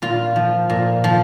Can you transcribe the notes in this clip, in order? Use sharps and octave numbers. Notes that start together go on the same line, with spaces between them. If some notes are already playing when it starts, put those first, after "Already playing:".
A#2 F4
F3
A#2
F3